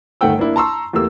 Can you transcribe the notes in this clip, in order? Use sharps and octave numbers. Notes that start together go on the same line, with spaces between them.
G1 D#3 A3 F#5 G5 E6
A#3 D4 E4
A5 A#5 C6 C#6 E6
E2 A3 A#3 G4 E6